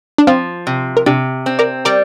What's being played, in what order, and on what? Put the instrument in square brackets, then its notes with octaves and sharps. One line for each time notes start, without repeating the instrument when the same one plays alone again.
[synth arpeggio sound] D4
[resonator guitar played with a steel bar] F3 [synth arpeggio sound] C4 F4
[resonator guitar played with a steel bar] C3
[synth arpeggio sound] A#4
[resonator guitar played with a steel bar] C3 [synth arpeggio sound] D4 G4
[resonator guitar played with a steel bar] C4
[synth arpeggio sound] A#4 D5
[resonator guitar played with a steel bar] G3 [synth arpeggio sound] A#4 D5